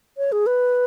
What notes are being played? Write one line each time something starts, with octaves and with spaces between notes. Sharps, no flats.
C#5
G#4
B4